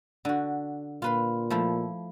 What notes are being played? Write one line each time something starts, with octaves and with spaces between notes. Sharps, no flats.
D3 F#4
A#2 F4 B4 C6
F3 A3 E4